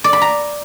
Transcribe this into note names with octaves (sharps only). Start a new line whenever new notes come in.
D5
B5
A#5